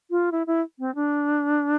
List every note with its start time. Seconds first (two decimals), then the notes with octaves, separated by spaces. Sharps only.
0.11 F4
0.32 E4
0.47 E4
0.79 C4
0.95 D4